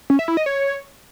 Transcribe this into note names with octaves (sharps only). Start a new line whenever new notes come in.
C#4
E5
E4
D#5
C#5